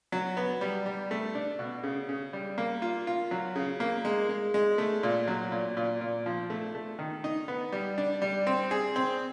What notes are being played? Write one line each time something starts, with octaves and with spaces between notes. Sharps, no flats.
F#3
B3
G3
G3
A3
D4
B2
C#3
C#3
G3
A#3
F4
F4
F#3
C#3
A#3
G#3
G#3
G#3
A3
A#2
F#3
A#2
A#2
A#2
F3
A3
A3
D#3
D#4
B3
G3
D4
G3
C4
G#4
C4